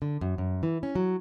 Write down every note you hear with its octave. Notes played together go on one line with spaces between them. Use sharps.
D3
F#2
F#2
E3
C#4
F#3